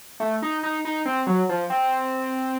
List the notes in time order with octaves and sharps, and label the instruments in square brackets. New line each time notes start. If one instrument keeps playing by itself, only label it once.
[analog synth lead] A3
D#4
D#4
D#4
C4
F#3
F3
C4